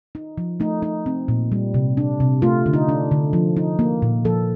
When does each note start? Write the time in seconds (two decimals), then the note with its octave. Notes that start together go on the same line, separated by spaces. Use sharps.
0.15 D#4
0.38 F3
0.60 A3 D#4
0.82 D#4
1.06 C4
1.28 A#2
1.52 G3
1.74 C3
1.97 D4
2.20 C3
2.42 A3 F4
2.66 D3
2.73 D#4
2.89 D4
3.11 D3
3.33 F3
3.57 D#4
3.79 A#3
4.02 A#2
4.25 F3 A4